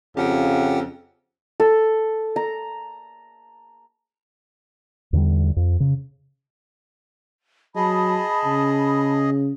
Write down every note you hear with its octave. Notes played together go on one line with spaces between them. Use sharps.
F2 C#3 G4 F#5 G5
A4
A#5
E2 D3 D#3 G3
F2
C#3
F#3 G#4 D#5 A5 B5
C#3